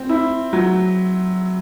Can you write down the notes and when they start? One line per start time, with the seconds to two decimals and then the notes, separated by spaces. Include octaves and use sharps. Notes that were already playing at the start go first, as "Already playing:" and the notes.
Already playing: C4
0.09 E4
0.53 F#3